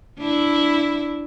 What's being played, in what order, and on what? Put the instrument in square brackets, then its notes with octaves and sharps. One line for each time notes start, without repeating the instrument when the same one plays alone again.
[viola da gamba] D4 E4